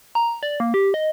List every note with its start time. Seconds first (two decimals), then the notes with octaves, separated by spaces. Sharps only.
0.15 A#5
0.43 D5
0.60 A#3
0.74 G4
0.94 D#5